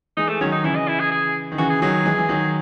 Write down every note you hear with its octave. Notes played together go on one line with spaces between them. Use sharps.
E3 G#3 D#4
A3
D#3 F#3 C#4
D#4
C#3 E3 E4
D#5
E4
G#4
G#4
D#3
C#3 E3 F#4
G#4
D#3 F#3 G#4
G#4
E3 G#3
E3
D#3 F#3